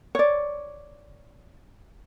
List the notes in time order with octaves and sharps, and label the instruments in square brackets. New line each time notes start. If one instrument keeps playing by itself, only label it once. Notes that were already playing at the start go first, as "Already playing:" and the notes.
[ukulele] C#5 D5